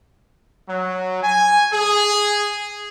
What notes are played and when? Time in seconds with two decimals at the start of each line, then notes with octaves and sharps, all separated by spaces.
0.69 F#3
1.23 G#5
1.73 G#4